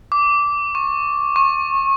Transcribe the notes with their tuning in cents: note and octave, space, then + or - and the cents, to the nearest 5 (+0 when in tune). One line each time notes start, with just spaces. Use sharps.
D6 -15
C#6 -20
C#6 -30